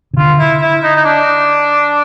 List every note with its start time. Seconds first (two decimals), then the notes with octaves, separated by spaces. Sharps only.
0.13 C#3
0.17 D3 F4
0.39 E4
0.62 E4
0.83 D#4
0.96 D#4
1.05 D4